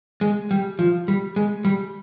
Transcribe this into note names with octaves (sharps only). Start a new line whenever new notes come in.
G#3
G3
F3
G3
G#3
G3